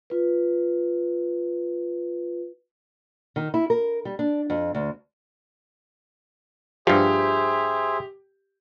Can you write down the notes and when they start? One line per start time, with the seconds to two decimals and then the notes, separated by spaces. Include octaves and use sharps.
0.10 F4 B4
3.36 D#3
3.54 E4
3.70 A#4
4.05 G3
4.19 D4
4.50 F2
4.75 D2
6.87 G2 F3 G4 G#4 C5 E5